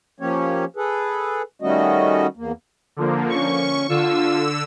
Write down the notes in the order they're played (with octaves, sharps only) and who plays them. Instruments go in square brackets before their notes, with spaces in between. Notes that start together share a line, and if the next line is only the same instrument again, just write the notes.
[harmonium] F3 A#3 C#4 G4 C#5
G#4 A4 B4
D#3 G3 A3 C#4 F#4 D#5
E2 A#3
[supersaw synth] D3 F3 A#3
[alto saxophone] C#4 [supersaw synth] C#6
[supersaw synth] D3 E6 [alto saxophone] F4